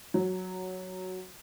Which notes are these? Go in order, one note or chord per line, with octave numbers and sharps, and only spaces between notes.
F#3